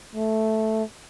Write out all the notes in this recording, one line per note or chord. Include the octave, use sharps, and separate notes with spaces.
A3